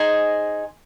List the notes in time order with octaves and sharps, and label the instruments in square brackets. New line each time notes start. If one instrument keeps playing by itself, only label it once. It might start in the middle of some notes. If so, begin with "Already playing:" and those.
Already playing: [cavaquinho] D#4 G#4 C5 D#5 G#5